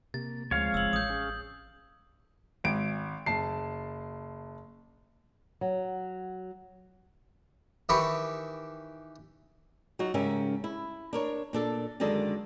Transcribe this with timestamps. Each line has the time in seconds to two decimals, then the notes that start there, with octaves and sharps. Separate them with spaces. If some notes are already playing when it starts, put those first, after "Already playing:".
0.14 C3 A#3 A6
0.51 D2 F3 G#3 C4 C#5 F5
0.74 F#1 E6 F#7
0.93 A1 D#6 G6
1.10 C#4 G#4
2.64 G#1 D7
3.26 F#1 A5 C7
5.61 F#3
7.89 D#3 E3 G4 B5 C#6
9.99 F#3 D#4 F4 F#4
10.14 G#2 C#3 C#4 G4 A#4 E5
10.64 E4
11.13 D4 A#4 C#5
11.53 A#2 D4 A4
12.00 F#2 D3 D#3 G#3 A4 D5